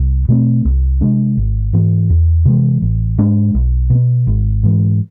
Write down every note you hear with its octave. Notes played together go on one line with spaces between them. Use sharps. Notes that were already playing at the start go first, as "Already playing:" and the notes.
Already playing: C2
B2 A3 C4
C2
C3 G#3 D4
G#1
G#2 E3 B3
E2
C3 E3 G#3
A1
G#2 G#3 D4
B1
B2 B3
G#1
G#2 E3